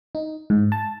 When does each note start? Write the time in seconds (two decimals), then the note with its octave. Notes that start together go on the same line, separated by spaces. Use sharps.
0.15 D#4
0.50 G#2
0.72 A5